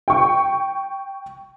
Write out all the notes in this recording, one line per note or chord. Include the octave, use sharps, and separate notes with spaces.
G5 C#6